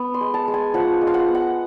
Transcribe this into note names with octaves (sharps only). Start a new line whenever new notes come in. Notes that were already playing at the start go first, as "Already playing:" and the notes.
Already playing: B3
C6
G#3
A5
G#3
G#5
F3 F#5
G#3
F5
F#5
B3
F#5